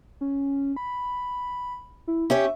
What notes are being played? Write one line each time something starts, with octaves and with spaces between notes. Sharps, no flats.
C#4
B5
E4
C#4 G4 C#5 E5